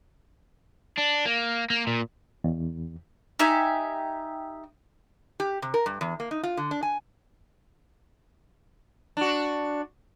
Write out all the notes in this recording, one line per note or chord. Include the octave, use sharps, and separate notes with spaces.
D4
A#3
A#3
A#2
E2
D#4 G4 E5 G#5
G4
C3
A#4
G2
E2
A#3
D#4
F4
D3
D4
G#5
D4 F#4